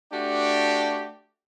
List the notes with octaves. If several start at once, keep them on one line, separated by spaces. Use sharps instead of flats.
A3 D4 F#4 G4